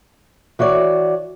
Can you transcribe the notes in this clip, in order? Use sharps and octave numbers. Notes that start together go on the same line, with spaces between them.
E3 F#4 C#5 D5